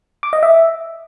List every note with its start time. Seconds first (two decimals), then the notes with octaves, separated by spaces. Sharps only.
0.23 D6
0.33 D#5
0.43 E5